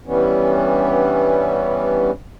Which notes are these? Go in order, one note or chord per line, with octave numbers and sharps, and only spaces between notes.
G2 E3 G3 B3 C#4